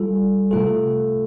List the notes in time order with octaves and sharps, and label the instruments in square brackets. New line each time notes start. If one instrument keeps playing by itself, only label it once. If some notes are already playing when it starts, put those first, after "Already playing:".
Already playing: [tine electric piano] G3 F4 A4
C3 A3 F4 A4